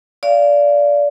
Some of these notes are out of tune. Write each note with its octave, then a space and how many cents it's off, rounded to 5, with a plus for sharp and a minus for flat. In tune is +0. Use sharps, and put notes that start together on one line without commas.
D5 -20 F5 -15